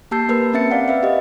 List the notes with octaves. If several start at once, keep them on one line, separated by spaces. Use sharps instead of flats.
A#3 G4 A5 E6 G6 C7
A#3 A#4 B4 E6
C4 C#4 A#4 E5 A6 C#7
D5 F5 F#5
B4 E5 F5
G4 D#5